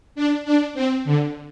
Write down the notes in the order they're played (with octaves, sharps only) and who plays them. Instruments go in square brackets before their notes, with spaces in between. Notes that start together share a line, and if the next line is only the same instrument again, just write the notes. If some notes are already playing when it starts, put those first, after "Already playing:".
[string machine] D4
D4
C4
D3